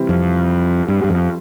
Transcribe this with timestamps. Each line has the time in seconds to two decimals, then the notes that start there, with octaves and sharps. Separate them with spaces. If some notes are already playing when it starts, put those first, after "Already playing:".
Already playing: C3 E3 G3 C4 E4
0.09 F2
0.88 G2
1.04 G2
1.10 F2